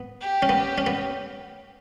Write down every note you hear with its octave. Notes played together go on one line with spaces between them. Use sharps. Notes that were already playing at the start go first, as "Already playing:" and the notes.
Already playing: B3
G4
C#4
B3
C#4
B3